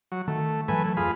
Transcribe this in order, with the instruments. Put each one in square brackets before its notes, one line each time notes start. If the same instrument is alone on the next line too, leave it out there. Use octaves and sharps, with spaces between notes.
[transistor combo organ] F#3
[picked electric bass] D#3 [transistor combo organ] A3
[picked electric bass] G#2 E3 F#3 [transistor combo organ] A3 B4 G#5
[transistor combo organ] A3
[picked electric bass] D#1 F2 [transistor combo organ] F4 G#4 B5